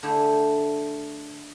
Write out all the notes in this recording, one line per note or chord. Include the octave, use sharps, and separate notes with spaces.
D3 A3 E4 G4 G#4 E5